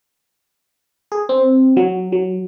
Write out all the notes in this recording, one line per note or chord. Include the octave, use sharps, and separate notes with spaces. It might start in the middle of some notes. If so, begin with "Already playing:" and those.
G#4
C4
F#3
F#3